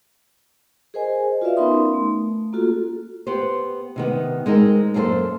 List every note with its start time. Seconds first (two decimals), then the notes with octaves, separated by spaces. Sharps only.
0.94 G#4 A#4 C5 D#5 G#5
1.42 F4 F#4 B4 D5 E5 F5
1.57 B3 C#4 D#4 A#4 C6 D#6
1.93 A3
2.53 A#3 C#4 F4 F#4 G#4 A4
3.27 B3 G4 B4 C5
3.96 C3 D#3 B3
4.46 G#3 C4 D#4 A#4
4.94 F#2 A#3 C#4 G#4 A4 C5